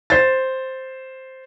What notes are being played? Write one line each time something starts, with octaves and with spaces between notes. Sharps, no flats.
C5 A6